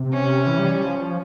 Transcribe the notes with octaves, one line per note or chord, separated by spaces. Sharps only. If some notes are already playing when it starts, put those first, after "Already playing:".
Already playing: C3
C#4
E3
G3
G3
F3
F3